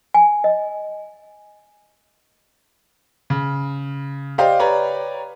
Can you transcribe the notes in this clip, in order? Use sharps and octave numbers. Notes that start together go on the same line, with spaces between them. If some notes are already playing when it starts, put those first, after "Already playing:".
G#5
D#5
C#3
G4 C5 D5 D#5 F5 G5
G4 B4 C#5 D5 A#5